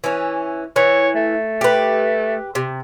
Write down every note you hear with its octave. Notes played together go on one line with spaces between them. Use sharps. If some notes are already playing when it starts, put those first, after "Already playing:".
E3 C#4
E3 C#5
A3
G4 B4
C3